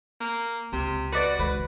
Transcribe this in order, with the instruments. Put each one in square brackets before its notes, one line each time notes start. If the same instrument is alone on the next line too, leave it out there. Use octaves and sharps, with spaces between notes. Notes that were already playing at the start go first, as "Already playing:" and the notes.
[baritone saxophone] A#3
[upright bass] C#2 [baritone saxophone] C3
[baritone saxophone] F#4 [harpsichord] B4 D5
[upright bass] C#2 D#3 [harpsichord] B4